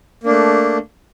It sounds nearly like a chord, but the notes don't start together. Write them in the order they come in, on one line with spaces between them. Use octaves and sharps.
A#3 D4 A3